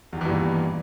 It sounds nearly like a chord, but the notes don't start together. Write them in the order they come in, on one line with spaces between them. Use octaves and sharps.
E2 D#3 E3 G2 A#2